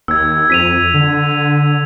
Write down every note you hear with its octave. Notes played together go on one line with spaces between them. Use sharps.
D#2 E6 G#6
F2 B6 D#7 F7
D3